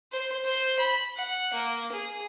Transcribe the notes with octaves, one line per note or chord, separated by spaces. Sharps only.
C5
C5
B5
F#5
A#3
G#4